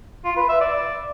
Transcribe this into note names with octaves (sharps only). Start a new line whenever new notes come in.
F4
B4
E5
D5